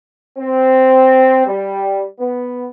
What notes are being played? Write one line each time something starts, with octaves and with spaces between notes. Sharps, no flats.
C4
G3
B3